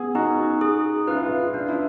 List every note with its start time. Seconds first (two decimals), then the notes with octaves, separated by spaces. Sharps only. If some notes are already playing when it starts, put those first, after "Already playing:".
Already playing: B3 G#4
0.15 D#4 F#4
0.61 G#4
1.08 F4 B4
1.16 E4
1.24 F4
1.54 D4 F4
1.69 E4